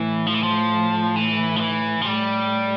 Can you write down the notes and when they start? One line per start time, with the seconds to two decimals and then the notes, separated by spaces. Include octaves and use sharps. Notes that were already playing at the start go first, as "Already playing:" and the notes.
Already playing: A2 E3
0.27 F3
0.34 E3
0.43 F3
1.16 E3
1.56 F3
1.60 E3
2.01 F3
2.05 A2 G3